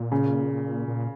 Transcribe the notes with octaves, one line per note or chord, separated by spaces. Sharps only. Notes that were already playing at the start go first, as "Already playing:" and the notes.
Already playing: A#2
C#3
A#2